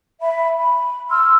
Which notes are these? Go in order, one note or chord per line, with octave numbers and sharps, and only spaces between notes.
E5 B5
B5
C6 E6 F6